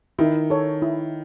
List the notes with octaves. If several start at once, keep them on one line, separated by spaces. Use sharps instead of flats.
D#3 E4
A4 C#5
E4